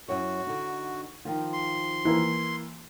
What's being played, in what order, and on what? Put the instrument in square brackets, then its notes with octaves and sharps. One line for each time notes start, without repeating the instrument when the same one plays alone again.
[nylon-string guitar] F#2 E4 C#5 [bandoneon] F#4
[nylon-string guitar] D3 D#4
D#3 F3 F4
[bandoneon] C6
[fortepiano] E3 A#3